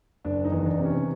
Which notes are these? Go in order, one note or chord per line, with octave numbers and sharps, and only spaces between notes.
F#1 D4
D#4
E2
D4
C3
C#4